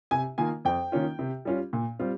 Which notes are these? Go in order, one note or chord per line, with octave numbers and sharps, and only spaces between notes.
C3 G#5
D#3 A#3 F4 G#5
F2 G5
D#3 A#3 C#4 F4
C3
G3 C#4 F4
A#2
G3 C4 F4